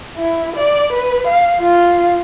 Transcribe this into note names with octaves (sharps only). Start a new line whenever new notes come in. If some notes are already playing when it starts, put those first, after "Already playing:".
E4
D5
B4
F5
F4